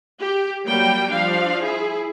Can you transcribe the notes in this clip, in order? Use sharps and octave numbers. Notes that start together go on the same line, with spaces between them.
G4
F#3 G3 A#3 G5
F3 D4 F5
E4 G#4